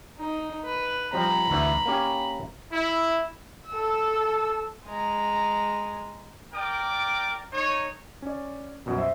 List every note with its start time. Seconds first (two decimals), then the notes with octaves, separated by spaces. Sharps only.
0.19 D#4
0.65 B4
1.13 F3 G3 C4 A#5 B5
1.50 D2 E3
1.86 A#3 C#4 G4
2.72 E4
3.68 A4 E6
4.87 G#3 A#5
6.53 A#4 D5 G5 D6
7.53 D#4 C#5
8.22 C#4 D5
8.86 C2 F#2 B2
8.98 C5 E5